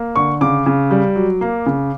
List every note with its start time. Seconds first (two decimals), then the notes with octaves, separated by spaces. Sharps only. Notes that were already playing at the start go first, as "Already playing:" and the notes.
Already playing: A#3
0.16 D3 C#6
0.41 C#3 D6
0.66 C#3
0.91 G3
1.16 F#3
1.41 A#3
1.66 C#3